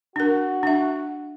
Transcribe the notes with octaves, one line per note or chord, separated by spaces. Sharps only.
D4 F#4 A#4
D4 E5